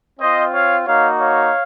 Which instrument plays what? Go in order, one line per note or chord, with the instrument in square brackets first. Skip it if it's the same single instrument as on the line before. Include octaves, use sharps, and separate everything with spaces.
[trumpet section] C4 F4 C5 D#5
C#5 F5
A#3 D#4 F#4 C#5 F5
C#5 F5